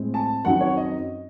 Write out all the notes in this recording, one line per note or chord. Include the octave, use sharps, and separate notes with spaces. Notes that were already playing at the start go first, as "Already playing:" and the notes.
Already playing: A2 G#3 C4
A5
F#2 D#3 F#3 C4 F#5
C#5
D#5